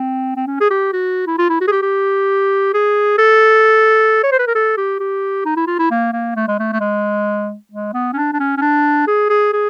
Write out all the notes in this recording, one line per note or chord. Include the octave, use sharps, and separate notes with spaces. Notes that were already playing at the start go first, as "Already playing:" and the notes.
Already playing: C4
C4
C#4
G#4
G4
F#4
E4
F4
E4
F#4
G#4
G4
G4
G#4
A4
C#5
C5
B4
A#4
A4
G4
G4
D#4
E4
F4
E4
A#3
A#3
A3
G#3
A3
A3
G#3
G#3
B3
C#4
D4
D4
C#4
C#4
D4
G#4
G#4
G#4